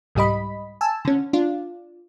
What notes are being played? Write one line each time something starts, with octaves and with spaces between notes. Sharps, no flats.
C2 G#2 G3 D#5 B5
G#5 A5 E6
D3 C#4
D4 F4